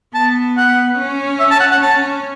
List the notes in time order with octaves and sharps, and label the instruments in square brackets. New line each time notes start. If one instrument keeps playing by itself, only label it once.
[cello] B3 [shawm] A5
[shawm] F#5
[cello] C#4
[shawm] E5
A5
F#5
F#5
[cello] C#4 [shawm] A5